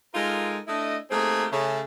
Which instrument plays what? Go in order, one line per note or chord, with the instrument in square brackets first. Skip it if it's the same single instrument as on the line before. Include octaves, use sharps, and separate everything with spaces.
[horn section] G#3 D#4 F4 A4 A#4
A3 D4 E4 D#5
A3 A#3 C4 D#4 G4 G#4
C#3 A3